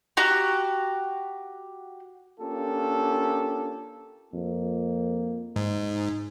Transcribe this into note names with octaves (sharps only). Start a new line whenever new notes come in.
F#4 G4 A#5
A#3 C#4 D4 F4 G4 A4
F2 A#3
G#2 D#4